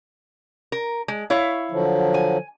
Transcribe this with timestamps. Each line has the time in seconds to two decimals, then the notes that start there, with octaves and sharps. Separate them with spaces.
0.72 A#4
1.08 G#3
1.30 E4 C#5 F5
1.71 D3 F3 F#3
2.14 G#5